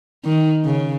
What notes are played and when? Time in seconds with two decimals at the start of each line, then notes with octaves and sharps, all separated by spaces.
0.25 D#3
0.64 C#3